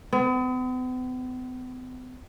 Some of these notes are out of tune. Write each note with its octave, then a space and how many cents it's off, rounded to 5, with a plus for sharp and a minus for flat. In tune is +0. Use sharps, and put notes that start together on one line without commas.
B3 +45